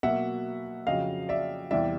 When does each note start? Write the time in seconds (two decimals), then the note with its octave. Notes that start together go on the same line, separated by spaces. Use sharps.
0.03 B2 F#3 A#3 E5 F#5
0.87 F2 C#3 F#3 D#5 F5
1.29 D5 E5
1.71 E2 C3 E3 G3 D5 E5